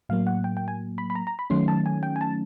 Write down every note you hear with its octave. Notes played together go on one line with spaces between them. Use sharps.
A2 F#3 A#3 F5
F#5
G5
G5
G#5
B5
B5
A#5
A#5
B5
D#3 F#3 A3 C#4 C6
A5
G#5
G5
G#5
A5